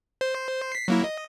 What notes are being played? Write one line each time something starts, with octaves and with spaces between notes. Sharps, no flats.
C5
B6 C7
F#3 A#3 E4
D#5